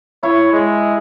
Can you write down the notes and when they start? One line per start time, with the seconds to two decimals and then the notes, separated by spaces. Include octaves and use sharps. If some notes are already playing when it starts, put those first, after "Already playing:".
0.23 E4 C#5
0.52 G#3